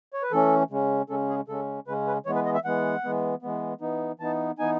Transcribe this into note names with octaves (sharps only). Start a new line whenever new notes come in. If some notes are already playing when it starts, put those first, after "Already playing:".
C#5
B4
E3 A3 C#4 A4
C#3 G#3 C#4
C#3 G#3 C#4 A4
G#4
C#3 G#3 C#4 A4
C#3 G#3 C#4 B4
B4
E3 G#3 B3 C#5
B4
D#5
E5
E3 G#3 B3 F#5
E3 G#3 B3
E3 G#3 B3
E3 B3 D#4
E3 B3 D#4 A5
E3 B3 D#4 G#5